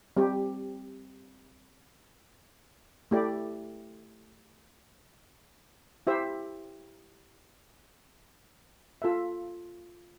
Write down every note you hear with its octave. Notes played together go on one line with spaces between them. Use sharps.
G3 C4 G4
A3 E4 G4 D5
E4 G4 C5 E5
F4 A4 E5